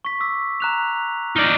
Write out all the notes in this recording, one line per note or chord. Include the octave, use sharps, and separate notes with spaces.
C#6 B6
D6 E6 B6
A#5 F#6 F7
D#4 D5 F6